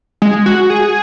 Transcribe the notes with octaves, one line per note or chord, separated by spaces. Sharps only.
G#3
F#4
G#4